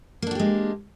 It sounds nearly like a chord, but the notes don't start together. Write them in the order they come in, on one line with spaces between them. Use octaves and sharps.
A#3 D4 F#4 G4 G#3